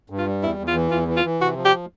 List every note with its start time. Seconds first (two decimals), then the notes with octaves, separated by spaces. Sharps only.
0.10 G2
0.19 F4
0.26 G3
0.42 E2 E4
0.59 E2
0.68 F4
0.75 E3
0.91 E2 F4
1.08 E3
1.17 F4
1.24 E3
1.40 C3 F#4
1.57 F3
1.65 G4